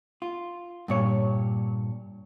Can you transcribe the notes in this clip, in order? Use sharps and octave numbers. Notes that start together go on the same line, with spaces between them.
F4
G2 A#2 C#5